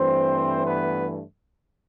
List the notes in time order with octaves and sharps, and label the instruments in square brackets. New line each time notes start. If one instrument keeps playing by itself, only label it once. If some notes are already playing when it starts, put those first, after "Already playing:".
Already playing: [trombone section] G2 E3 A3 C4 C5
B3 B4